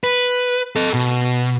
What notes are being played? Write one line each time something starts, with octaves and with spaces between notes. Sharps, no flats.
B4
A4 D#5
B2